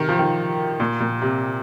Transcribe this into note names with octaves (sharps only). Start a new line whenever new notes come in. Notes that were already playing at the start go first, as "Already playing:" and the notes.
Already playing: C3 D#3
F3
D#3
A#2
A#2
C3